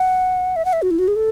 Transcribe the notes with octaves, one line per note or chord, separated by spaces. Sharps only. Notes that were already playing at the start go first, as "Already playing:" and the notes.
Already playing: F#5
E5
F#5
E5
F#4
E4
F#4
G#4
A4